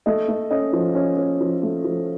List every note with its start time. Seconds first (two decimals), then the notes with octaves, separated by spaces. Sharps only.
0.06 A3 D#5
0.29 A3
0.51 C#4 D#5
0.73 F3
0.95 C#4
1.17 C#4
1.40 F3
1.63 A3
1.84 F3